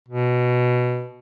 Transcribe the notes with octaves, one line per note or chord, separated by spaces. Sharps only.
B2